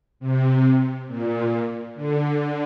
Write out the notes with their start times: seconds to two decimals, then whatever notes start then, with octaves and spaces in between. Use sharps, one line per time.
0.20 C3
1.08 A#2
1.95 D3